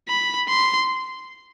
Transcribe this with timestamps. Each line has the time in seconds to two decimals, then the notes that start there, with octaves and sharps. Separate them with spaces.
0.08 B5
0.49 C6